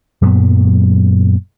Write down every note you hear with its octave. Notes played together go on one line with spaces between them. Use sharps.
F#2 A#2 F#3 B3